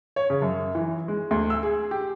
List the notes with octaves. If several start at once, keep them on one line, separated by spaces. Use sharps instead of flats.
C#5
C#3
F#2
E3
G#3
D2
E6
G#4
G4